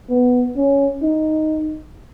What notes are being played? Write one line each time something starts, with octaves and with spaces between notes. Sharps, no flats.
B3
C#4
D#4